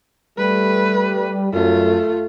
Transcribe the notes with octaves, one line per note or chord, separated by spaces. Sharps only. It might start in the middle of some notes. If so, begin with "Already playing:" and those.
G3 A3 B4
F#2 A3 F4